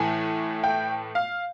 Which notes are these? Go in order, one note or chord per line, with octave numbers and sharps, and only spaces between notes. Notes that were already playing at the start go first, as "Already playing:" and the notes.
Already playing: A2 E3 A3 G#5
G5
F5